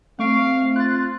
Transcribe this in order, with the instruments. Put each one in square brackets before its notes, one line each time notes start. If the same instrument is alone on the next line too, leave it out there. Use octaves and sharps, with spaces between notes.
[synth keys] A3 C#6 D7 [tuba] C4 [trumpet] F5
[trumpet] F4 [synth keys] F#6 A6